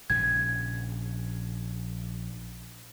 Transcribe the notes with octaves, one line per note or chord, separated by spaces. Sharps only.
A#1 C#3 G#6